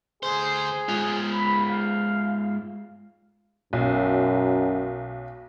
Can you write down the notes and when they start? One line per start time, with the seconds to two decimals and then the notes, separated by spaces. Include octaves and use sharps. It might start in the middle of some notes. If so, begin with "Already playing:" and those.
0.23 D2 G#4 C5
0.89 G#2 F4
1.31 B5
1.70 F5
3.73 B1 F#2